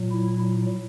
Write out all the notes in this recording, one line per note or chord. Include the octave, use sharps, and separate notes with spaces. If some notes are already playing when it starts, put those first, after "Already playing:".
Already playing: A#2 F#3
E4